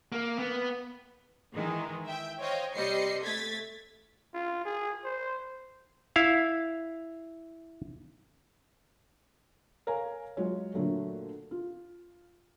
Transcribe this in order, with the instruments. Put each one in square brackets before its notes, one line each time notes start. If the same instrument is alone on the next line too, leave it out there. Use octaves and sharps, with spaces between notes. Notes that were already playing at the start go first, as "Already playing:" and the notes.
[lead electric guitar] A#3
B3
[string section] D#3 E3 G#3 D#4
E5 G5
C5 C#5 D#5 F5 G5
C3 G3 C5 D#5 C7 C#7
A3 G#6 A6 B6
[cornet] F4
G#4
C5
[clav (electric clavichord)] E4 F5
[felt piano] A#4 C#5 F5 G#5 A#5
F#3 G#3 F4 F#4 C#5
A#2 D3 F#3 A3
F4